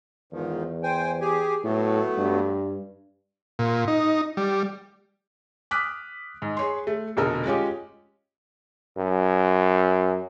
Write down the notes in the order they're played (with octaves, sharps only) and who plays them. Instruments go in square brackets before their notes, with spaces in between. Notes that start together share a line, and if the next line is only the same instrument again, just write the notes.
[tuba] E2 [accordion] G#2 D#3 F3
[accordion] C5 G5 G#5
G4 G#4 G#5
[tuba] A2 [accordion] F#3 A3 B3
[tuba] G2
[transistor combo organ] A#2
D#4
G3
[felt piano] D6 D#6 F6 F#6 B6
G#2
G#4 C#5 C6
A3
F1 B2 D3 A4 A#4 D#5
G#3 C#4 F4 G4
[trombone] F#2